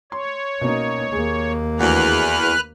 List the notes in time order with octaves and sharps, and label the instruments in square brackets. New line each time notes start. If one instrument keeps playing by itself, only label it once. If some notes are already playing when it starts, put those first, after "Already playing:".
[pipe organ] C#5 [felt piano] C6
[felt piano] B2 C#4 [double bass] A#3 D#4
[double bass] D#2 A#3 [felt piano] G#4
[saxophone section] E2 [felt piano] A3 D4 F#4 [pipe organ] B4 F6 F#6